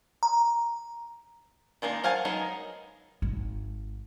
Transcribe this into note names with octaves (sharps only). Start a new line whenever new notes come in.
A#5
D#3 G#3 A#3 D4
C5 F5 F#5 G#5 A5
F#3 G#3 B3 D#4 A#4
G#1